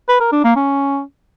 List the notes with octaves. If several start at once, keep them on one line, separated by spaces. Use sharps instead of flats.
B4
A#4
D4
A#3
C#4